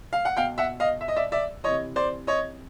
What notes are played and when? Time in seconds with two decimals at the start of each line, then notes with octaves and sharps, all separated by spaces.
0.13 F5
0.25 F#5
0.37 B2 F5 G5
0.58 E5 F#5
0.80 D#5 F5
1.01 E5
1.08 D#5
1.16 D5 E5
1.32 D5 E5
1.64 C3 E3 C#5 D#5
1.96 C5 D5
2.27 C#5 D#5